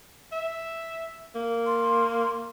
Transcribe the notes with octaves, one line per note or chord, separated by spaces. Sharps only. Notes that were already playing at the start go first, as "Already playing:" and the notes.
E5
A#3
C6